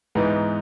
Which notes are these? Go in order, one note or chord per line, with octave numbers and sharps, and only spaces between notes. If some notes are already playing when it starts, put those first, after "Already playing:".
G#2 E3 B3 D#4